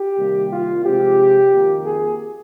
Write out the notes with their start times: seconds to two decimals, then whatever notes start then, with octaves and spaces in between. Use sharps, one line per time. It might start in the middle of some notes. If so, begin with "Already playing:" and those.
Already playing: G4
0.19 C3 D#3 G3 A#3
0.52 F4
0.85 C3 F3 G#3 C4 G4
1.51 F2 D#3 A#3
1.85 G#4